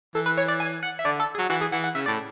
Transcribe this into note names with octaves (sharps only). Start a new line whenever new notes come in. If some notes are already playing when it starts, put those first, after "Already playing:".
E3 A4
B4
C#5
D5
G#5
F#5
E5
D3 D5
A4
G#4
F#3
E3 F#4
G#4
E3 F#5
F#5
C#3 E5
A2 D5